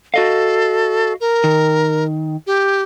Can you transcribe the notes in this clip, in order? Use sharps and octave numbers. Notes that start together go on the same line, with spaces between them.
F#4 A4 D#5 F5
A#4
D#3
G4